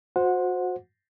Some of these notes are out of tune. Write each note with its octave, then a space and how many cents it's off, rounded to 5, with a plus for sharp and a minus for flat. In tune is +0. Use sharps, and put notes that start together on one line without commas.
F#4 -30 C5 +0 F#5 -20